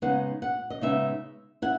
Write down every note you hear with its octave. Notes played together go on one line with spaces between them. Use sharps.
C#3 G#3 B3 D#4 F#5
F#5
D#5
C#3 G#3 B3 D#4 E5
E4 F#5